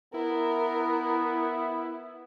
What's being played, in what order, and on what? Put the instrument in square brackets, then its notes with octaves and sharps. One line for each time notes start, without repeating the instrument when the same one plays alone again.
[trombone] B3 [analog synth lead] E4 [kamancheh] A#4